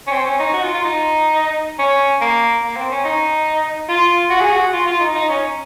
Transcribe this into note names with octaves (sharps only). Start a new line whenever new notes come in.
C#4
C4
C#4
D#4
F#4
F4
F4
D#4
C#4
A#3
A#3
C4
C#4
D#4
F4
F#4
G#4
F#4
F4
F4
D#4
D#4
C#4